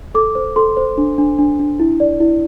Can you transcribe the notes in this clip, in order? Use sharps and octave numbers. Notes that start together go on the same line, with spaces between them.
A4 D6
C5
A4 C6
C5
D4
D4
D4
D4
E4
D5
E4